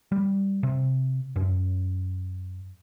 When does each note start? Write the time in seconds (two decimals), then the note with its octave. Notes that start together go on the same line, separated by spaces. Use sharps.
0.12 G3
0.63 C3
1.36 F#2